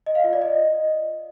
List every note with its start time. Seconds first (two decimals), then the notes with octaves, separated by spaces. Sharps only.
0.06 D#5
0.15 F5
0.24 F4
0.33 D5
0.42 D#5